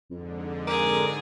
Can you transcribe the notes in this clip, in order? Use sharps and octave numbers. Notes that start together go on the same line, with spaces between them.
F2 G#2 D3
G#4 A#4 D6